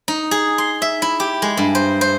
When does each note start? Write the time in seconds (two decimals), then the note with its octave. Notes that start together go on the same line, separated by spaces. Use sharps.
0.08 D#4
0.31 G#4
0.58 C6
0.82 E5
1.02 E4
1.20 G4
1.42 G#3
1.57 G2
1.75 C5
2.01 C5